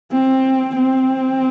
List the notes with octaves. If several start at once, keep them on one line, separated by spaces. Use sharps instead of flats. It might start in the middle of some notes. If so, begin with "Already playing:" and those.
C4
C4